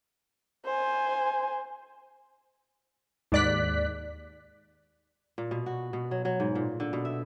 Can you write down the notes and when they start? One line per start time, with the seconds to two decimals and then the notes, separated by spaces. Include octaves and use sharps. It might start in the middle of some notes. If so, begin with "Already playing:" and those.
0.65 C5 G#5
3.32 D#2 G#2 D5 F#6 B6
5.38 A#2
5.51 B2
5.66 F#4
5.93 B2
6.11 F#3
6.25 F#3
6.40 G#2
6.55 A#2
6.80 D3
6.93 B2
7.05 E5